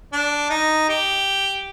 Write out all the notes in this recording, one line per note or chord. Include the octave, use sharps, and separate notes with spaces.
D4
D#4
G4